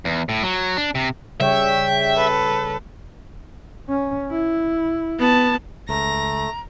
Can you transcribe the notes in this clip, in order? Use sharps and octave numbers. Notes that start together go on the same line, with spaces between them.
E2
A2
F#3
D4
C3
C#3 G3 C#5 E5 G5
A4 B4
C#4
E4
B3 A5
C#2 A3 A#5 A#6